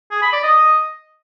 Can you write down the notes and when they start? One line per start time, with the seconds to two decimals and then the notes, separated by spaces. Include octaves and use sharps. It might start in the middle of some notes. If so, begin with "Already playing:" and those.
0.11 G#4
0.22 B5
0.33 D5
0.43 D#5